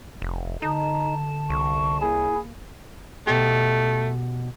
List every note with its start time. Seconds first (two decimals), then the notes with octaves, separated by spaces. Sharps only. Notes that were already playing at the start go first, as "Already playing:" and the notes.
0.22 F1
0.62 D3 D#4 A5 A#5
1.50 C2 C#6
2.01 A#3 E4 G#4
3.27 B2 A3 G4